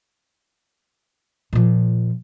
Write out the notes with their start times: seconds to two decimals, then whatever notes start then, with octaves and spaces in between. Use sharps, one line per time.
1.53 A#2 F3